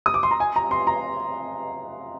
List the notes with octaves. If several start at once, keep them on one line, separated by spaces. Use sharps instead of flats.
D#6
D6
C6
A#5
G#5
A#5
C6
A#5